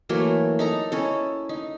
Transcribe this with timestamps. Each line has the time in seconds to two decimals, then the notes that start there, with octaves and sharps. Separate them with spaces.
0.09 E3 F#3 A3 A#3
0.59 D#4 A4 A#5
0.92 C#4 E4 A4
1.49 D#4